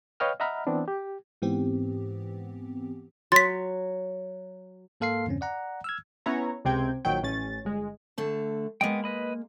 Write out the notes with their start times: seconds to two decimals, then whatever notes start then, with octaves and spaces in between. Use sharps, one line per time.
0.20 B4 C#5 D#5 F5 G5 F6
0.40 D#5 E5 F#5 A#5 B5 F6
0.67 E3 B3 C4 D4
0.88 G4
1.42 G#2 E3 B3 C4 G4
3.32 F#3 C6 A6 B6
5.00 G#2 A#3 A4 F5 C6 C7
5.26 E2 G2 C#3 C4 C#4
5.41 D5 F#5 A#5
5.84 E6 F6 G#6
6.26 B3 C#4 E4 C#5 A#5
6.65 C#2 C3 C4 G5 G#6
7.05 A#1 D#3 F#3 G5
7.23 A1 C#4 A6
7.65 G1 G#3
8.18 D3 A3 A5
8.81 G#3 A#3 B3 D#5 G5
9.04 B4 D#5 B5